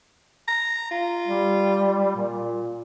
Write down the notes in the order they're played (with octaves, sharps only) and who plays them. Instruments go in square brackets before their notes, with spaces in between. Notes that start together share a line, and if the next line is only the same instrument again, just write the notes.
[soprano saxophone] A#5
F4
[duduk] G3
A#2